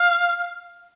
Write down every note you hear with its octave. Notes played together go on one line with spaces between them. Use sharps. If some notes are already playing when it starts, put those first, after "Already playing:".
Already playing: F5